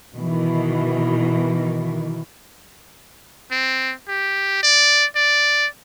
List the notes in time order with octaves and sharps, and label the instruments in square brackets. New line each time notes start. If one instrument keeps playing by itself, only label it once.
[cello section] B2 D#3 E3
[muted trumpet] C4
G4
D5
D5